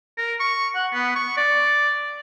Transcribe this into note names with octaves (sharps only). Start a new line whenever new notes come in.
A#4
C#6
F#5
B3
C#6
D5